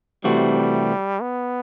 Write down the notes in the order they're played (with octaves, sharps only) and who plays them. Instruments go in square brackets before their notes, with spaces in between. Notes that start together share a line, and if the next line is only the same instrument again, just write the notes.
[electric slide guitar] C3 E3 A3 C4 F#4 [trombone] G3
[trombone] B3